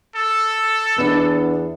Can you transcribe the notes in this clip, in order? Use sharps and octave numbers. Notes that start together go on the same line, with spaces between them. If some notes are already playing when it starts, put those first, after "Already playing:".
A4 E6
E2 B3 D4